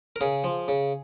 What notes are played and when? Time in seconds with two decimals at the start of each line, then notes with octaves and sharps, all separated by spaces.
0.16 A#4
0.21 C#3 G#4
0.44 F3
0.68 C#3